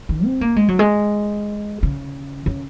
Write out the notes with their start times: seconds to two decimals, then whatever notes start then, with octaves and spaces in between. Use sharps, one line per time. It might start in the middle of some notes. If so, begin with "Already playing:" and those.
0.09 D#3
0.25 C4
0.41 A#3
0.56 G#3
0.68 F#3
0.79 G#3
1.83 C#3
2.46 C#3